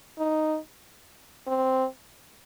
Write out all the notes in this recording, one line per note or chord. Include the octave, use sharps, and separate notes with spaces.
D#4
C4